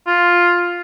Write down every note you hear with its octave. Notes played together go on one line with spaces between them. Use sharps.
F4